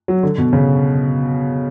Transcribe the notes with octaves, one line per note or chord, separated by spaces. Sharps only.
F#3
D3
B2
C#3